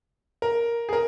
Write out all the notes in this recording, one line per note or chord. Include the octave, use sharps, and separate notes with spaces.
A#4
G#4
A#4